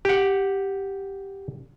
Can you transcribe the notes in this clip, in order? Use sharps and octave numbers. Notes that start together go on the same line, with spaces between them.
G4 F#5